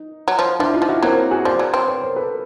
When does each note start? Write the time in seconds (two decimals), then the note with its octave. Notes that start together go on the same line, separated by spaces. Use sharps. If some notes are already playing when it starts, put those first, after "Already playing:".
Already playing: D#4
0.28 F#3
0.39 F3
0.59 F3 D4 E4
0.74 D#4 F4
0.82 F3
0.88 E4 F#4
1.02 F#3 A#3 C4
1.31 F#4 G#4
1.45 F3 C5 D5
1.59 F#3
1.74 C4
1.87 B4 C#5
2.02 A#4 C5
2.16 A4 B4